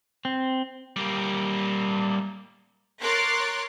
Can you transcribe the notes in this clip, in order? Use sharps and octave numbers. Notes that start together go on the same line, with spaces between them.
C4
G3 A#3
A#4 C#5 C6 D6 F#6 A6